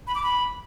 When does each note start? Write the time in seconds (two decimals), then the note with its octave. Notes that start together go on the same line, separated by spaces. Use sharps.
0.07 B5
0.15 D6
0.23 B5